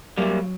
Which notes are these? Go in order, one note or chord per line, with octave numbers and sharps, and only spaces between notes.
F#3 G3 A#3